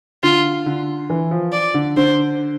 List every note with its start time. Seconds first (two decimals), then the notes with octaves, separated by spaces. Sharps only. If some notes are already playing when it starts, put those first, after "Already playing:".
0.23 D3 F4
0.66 D3
1.10 E3
1.31 F3
1.53 D5
1.74 D3
1.97 D3 C5